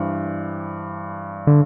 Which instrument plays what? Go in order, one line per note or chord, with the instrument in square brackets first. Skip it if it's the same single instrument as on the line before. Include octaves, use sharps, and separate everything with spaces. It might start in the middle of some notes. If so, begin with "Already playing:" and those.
Already playing: [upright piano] G2 E3 G3 D4 C5
[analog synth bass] D3